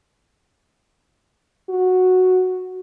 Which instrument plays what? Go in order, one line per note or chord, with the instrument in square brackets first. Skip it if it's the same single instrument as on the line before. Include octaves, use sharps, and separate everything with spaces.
[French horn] F#4